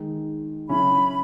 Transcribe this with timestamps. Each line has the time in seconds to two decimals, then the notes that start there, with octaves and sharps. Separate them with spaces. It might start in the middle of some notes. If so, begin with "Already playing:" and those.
Already playing: D#3 G#3 D#4
0.69 C#3 F#3 C#4 E4 B5